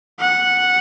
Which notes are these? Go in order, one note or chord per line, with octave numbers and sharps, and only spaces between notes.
F#5